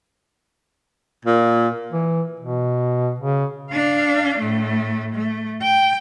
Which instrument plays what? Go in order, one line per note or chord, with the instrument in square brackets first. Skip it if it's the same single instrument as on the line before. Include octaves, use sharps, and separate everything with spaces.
[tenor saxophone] A#2
[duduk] E3
B2
C#3
[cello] D4 F5
A2 A3
A3
G5